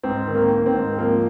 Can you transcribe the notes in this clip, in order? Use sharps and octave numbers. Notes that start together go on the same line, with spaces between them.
G#2 C4
D#3
A#3
D#3
C4
G#2
F3 A#3